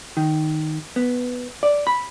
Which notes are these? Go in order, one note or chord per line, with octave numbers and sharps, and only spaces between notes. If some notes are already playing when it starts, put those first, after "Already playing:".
D#3
B3
D5
B5